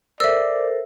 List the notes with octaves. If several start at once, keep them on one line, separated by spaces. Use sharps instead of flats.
A4 A#4 C5 D5 E5 E6